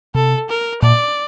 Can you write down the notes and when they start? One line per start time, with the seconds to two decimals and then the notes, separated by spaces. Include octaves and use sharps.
0.15 C3 A4
0.49 A#4
0.82 A#2 D5